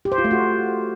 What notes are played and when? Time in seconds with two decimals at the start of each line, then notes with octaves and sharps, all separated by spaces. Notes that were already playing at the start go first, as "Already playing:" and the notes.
0.05 G4
0.12 C5
0.18 F4
0.24 A3
0.31 F#4